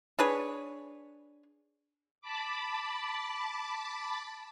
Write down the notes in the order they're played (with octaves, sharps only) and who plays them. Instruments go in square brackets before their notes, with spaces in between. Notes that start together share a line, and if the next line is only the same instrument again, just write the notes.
[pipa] D4 G#4 B4 C#5
[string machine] A5 B5 D6